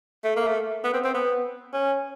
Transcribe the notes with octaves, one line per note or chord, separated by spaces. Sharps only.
A3
A#3
A3
B3
C4
C4
B3
C#4